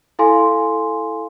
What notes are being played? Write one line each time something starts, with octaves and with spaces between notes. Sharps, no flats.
E4 A4 F5 G#5 C6